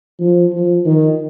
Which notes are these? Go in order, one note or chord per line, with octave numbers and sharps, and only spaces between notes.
F3
F3
D#3